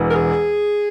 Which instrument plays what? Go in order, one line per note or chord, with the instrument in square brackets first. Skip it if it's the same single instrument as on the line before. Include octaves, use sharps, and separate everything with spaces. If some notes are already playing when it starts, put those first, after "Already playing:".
Already playing: [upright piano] E1 E2 E3
[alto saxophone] A#4
G#4